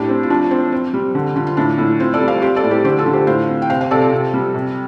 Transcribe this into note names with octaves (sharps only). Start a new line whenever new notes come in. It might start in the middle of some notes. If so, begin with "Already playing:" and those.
Already playing: A2 D4 G4
C4
F4
F3 D4
C4
C4
G3
D3
D3 F4
F4
A2 D4
A2
C4 F4
A4 D5
G3
C5 F5
C4 G4 C5
A4 D5
A2
G4 C5
D3 G4 C5
F4 A4
D3
G4 C5
A2 C5 F5
C4
G5
C3 C5 F5
C5 F5
C3 A4 D5
F4 A4
C3
G3
C3